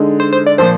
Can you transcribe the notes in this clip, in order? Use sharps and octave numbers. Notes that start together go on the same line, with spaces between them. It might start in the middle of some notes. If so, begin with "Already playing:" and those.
Already playing: D3 G#3 D#4
C5
C5
D5
A#2 F3 C5